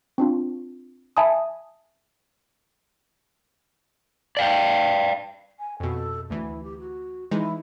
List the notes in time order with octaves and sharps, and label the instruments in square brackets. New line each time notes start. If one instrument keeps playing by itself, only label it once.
[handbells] C4 D4 F4
E5 G#5 A5 B5 D#6
[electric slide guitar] D5 F5 G5
[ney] G#5
[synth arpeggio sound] F2 B2 [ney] A4
[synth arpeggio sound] D2 E3 [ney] E4
[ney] G4
F#4
[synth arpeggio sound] E3 G#3 D#4 [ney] E4